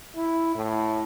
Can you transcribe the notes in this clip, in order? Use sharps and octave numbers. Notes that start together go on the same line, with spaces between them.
E4
A2